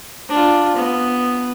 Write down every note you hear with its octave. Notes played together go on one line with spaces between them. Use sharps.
D4 F4
B3